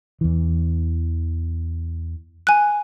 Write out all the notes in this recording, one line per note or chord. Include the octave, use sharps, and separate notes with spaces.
E2 E3
G#5 F#6